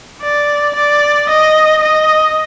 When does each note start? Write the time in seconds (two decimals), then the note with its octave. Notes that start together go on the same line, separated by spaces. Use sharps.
0.22 D5
0.75 D5
1.29 D#5
1.83 D#5